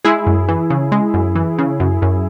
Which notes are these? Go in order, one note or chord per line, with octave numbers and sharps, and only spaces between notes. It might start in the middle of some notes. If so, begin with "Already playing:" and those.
G#3 E4 G#4
F#2
E3
C#3
G#3
F#2
E3
C#3
F#2
F#2